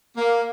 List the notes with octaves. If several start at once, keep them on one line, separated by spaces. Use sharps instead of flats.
A#3